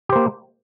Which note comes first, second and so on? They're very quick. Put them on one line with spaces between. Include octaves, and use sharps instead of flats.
G4 C5 A#3